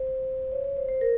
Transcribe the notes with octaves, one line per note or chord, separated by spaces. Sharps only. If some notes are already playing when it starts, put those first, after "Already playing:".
Already playing: C5
C#5
C#5
C5
C5
A#4